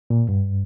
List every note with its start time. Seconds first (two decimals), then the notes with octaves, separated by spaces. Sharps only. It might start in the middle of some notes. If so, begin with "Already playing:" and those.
0.10 A#2
0.29 G2